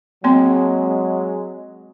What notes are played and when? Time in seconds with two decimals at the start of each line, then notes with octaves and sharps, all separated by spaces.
0.24 F#3 G#3 A#3 C4 C6